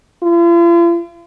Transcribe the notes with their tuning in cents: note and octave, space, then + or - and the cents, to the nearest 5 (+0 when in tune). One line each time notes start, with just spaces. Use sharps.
F4 -45